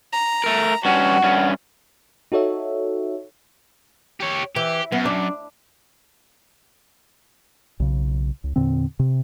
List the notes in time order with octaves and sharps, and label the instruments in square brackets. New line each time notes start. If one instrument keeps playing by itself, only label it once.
[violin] A#5
[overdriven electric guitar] A3 A#4
[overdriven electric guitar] G2 C#4 [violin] F#4 [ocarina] F#5
[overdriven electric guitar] G2 C#4
[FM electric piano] D#4 F#4 A4 C#5 E5
[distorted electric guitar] G4 C#5
[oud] E3 [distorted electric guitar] G4
[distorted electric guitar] F#2 [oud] B3
[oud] D4
[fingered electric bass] B1 C#3
C#2
E2 A#2 D3 C4
C3